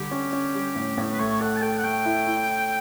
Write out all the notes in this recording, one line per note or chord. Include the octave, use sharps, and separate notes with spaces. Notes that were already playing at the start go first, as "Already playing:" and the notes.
Already playing: D3 G3 G4
C#4
C#4
G3
A2
A2
B4
A3 C#5
A4 F#5
A5
A4 G5
F#5
A3 G5
E4
E4